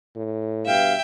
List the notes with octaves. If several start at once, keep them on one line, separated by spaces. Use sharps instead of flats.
A2
G2 B2 E5 F5 G5